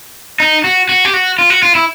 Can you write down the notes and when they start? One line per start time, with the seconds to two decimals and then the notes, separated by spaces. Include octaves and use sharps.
0.40 D#4
0.64 F#4
0.89 F#4
1.05 G4
1.14 F#4
1.39 F4
1.50 F#4
1.63 F4
1.75 E4